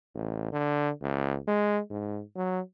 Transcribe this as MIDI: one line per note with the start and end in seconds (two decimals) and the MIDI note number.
0.15 0.47 33
0.53 0.90 50
1.01 1.37 37
1.48 1.80 56
1.90 2.21 44
2.36 2.60 54